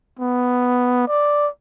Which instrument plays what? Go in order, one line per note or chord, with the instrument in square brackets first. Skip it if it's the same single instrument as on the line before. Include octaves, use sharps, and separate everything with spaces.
[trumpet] B3
D5